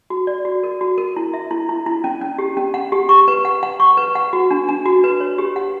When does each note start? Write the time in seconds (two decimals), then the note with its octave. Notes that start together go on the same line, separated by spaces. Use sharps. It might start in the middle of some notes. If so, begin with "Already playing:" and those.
0.10 F#4
0.27 D5
0.45 F#4
0.63 A#4
0.81 F#4
0.98 A#4
1.16 E4
1.34 E5
1.51 E4
1.69 E4
1.86 E4
2.04 C#4
2.21 C#4
2.39 G4
2.57 C#4
2.74 F#5
2.92 G4
3.09 C#6
3.28 B4
3.45 F#5
3.63 F#5
3.80 C#6
3.97 B4
4.15 F#5
4.33 F#4
4.51 D4
4.69 D4
4.86 F#4
5.04 B4
5.20 C#5
5.38 G4
5.56 F#5